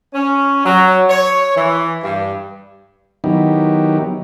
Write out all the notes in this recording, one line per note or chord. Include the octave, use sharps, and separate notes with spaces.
C#4
F#3
C#5
E3
G2
D#3 F#3 B3 D#4 E4 G4